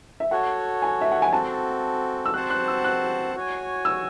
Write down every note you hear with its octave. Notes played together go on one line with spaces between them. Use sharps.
E5
F#4 A4 C#5 F#5
G#5
E5
F#5
G#5
C4 F#4 A4 A5
E6
C4 F#4 C5 F#5 A5 F#6
F#6
E6
F#6
F#4 C#5 G#5
E6